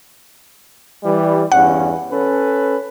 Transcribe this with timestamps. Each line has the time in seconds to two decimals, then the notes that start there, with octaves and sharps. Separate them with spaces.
1.04 E3 G3
1.52 E2 G2 C#4 F#5
2.11 C#4 A4 B4